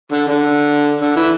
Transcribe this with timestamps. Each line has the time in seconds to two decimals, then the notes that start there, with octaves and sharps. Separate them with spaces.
0.12 D3
0.27 D3
1.01 D3
1.16 E3